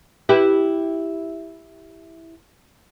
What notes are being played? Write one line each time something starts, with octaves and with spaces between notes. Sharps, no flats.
E4 G4 B4